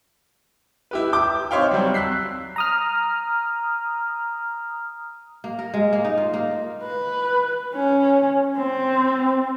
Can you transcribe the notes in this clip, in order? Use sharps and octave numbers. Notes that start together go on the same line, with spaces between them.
E4 G4 B4
D6 G6
C4 D#4 C#5 E5 F5 G5
F#3 G3 C4
E6 F#6 B6 C7
A#5 D#6 F6
A#3
A#4
G#3
A#3
D#4
F4
A#3
B4
C#4
C4